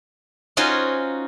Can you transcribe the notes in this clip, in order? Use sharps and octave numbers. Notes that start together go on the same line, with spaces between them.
C#4 D#4 F4 F#4 C5 G#5